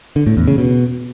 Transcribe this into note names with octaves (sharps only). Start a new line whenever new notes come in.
D3
A2
E2
C#3
B2